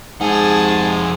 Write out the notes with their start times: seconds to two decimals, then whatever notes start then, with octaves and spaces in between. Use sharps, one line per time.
0.21 F2 G#2 G#4 F#5 A5